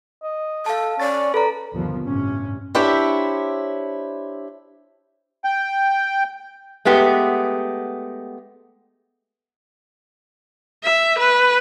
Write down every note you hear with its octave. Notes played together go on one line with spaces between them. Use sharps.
D#5
A4 F5 A5
C#4 D5 A6
A4 B4 A#5
G1 D#2 B2 F3 B3
A1 G2 C3 C#4
D4 E4 G4 C5 C#5 E5
G5
G#3 A3 B3 G4
E5
B4